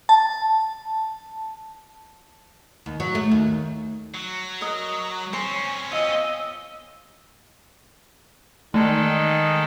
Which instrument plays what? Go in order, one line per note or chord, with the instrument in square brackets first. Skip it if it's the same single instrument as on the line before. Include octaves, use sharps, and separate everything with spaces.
[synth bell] A5
[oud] D#2
F#3
A3
D#2
[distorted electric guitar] F#3
[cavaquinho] A#4 D#5 [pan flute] A#5
[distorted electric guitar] C4 C#4 [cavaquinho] C#5 C6 [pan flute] G#5
[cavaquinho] F4 [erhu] D#5 [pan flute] E6
[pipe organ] D#3 G#3 A4 [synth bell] E3 A3 D#4